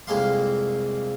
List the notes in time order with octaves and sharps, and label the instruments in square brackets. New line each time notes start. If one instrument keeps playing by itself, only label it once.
[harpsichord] C2 F2 G#3 A#3 F5 C6